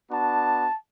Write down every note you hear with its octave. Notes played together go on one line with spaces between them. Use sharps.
B3 D4 F#4 A5